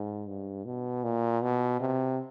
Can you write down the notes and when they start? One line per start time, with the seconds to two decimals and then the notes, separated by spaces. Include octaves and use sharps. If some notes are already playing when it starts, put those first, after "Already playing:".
Already playing: G#2
0.27 G2
0.65 B2
1.04 A#2
1.42 B2
1.80 C3